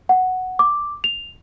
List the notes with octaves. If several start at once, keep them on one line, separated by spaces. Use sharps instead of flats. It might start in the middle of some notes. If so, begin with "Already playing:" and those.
F#5
D6
F7